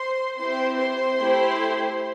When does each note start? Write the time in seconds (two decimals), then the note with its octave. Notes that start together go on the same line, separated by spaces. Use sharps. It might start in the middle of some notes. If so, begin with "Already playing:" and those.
Already playing: C5 C6
0.38 C4 E4 G4 C5 C6
0.78 C5 C6
1.19 A3 E4 G4